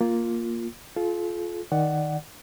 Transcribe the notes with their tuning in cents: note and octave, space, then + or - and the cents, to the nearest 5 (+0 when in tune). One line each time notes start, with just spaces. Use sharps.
A#3 +0 F4 +0
F4 +0 A4 -45
D#3 +0 D5 +0 F#5 +10